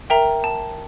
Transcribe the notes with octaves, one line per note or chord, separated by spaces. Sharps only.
A#4 E5 G5 A#5
A5